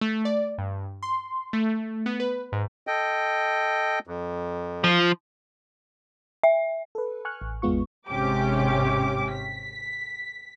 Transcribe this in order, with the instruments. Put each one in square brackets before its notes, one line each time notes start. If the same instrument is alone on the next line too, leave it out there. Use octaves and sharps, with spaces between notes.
[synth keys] A3
D5
G2
C6
A3
B3
B4
G#2
[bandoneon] A4 D#5 G5
F2
[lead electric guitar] F3
[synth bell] E5
[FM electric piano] A4 B4
G#5 C#6 F6 F#6
A1
G#1 E2 G#3 B3 F4 C#6
[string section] G#1 G#2 C3 C#4 G4 D6
B6